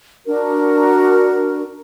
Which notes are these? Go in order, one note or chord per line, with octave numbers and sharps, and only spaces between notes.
D4 F#4 A#4